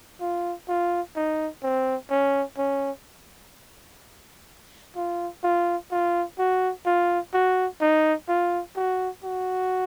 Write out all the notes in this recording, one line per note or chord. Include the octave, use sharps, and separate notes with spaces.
F4
F4
D#4
C4
C#4
C#4
F4
F4
F4
F#4
F4
F#4
D#4
F4
F#4
F#4